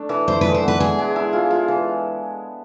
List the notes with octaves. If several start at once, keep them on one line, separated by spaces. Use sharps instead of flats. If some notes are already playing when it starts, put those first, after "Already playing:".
Already playing: A3 D4
E3
E4 C5
G#3 B4
C5
B3
B4
G#3 G#4
G#3
E4
F4
F4
E3